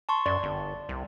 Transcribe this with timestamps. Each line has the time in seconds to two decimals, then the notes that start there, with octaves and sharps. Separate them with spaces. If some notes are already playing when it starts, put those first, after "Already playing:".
0.09 A5 C6 C#6
0.26 F#2 D5
0.43 G1
0.89 C2